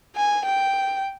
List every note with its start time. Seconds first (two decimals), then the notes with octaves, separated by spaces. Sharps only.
0.16 G#5
0.46 G5